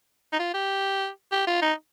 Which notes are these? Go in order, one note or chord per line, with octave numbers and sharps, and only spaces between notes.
D#4
F4
G4
G4
F4
D#4